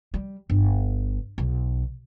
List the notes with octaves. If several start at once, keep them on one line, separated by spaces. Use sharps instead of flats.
G3
G1
B1